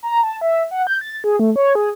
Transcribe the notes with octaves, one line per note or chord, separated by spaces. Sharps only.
A#5
A5
E5
F#5
G6
A6
G#4
A3
C#5
G#4